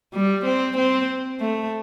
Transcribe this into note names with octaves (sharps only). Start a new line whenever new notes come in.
G3
C4
C4
A3